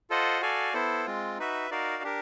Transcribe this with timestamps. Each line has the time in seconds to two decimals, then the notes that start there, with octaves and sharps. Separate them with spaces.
0.10 F4 A4 C5 D#5 F#5
0.41 F#4 A4 D5 F5 G#5
0.73 B3 E4 A4 C5
1.06 G#3 C4 F4
1.39 D#4 F#4 B4 E5
1.71 D#4 F#4 A#4 D5 F5
2.03 D4 G4 A#4